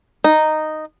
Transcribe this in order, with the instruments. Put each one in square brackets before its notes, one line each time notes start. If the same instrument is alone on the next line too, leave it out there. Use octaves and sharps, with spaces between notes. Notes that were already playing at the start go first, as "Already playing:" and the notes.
[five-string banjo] D#4